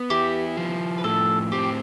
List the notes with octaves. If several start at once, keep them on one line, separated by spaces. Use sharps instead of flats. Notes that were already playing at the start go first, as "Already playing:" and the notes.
Already playing: B3
E4 G4
F3
B4
A2 A4
C4 G4